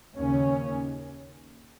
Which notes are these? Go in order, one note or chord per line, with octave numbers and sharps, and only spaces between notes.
D#2 C#3 C#4